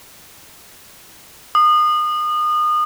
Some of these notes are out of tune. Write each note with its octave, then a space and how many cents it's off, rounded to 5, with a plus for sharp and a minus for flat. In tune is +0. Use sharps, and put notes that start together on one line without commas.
D#6 -30